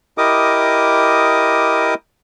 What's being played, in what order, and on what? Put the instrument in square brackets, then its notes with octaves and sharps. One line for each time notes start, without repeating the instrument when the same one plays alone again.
[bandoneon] E4 G4 A#4 D#5 D6 D#6